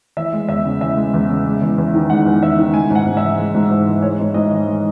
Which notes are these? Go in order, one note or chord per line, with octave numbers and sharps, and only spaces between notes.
E3 E5
G#3
E2 E5
C#3
E3 E5
G#3
E2
C#3
G#3
E2
E2
D#3
G#3 F#5
E2
E2 E5
D#3
G#3 G#5
G#2 F#5
G#2
E5
E3
G#3
G#2
G#2
E3
G#3 C#5
G#2
G#2 D#5
E3
G#3